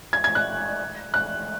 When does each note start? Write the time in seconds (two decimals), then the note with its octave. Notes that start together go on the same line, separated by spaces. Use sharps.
0.13 G#6
0.24 G#6
0.35 F#6
1.14 F#6